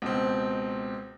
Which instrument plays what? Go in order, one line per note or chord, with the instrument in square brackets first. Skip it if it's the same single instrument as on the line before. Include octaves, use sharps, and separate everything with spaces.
[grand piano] C#2 B2 C4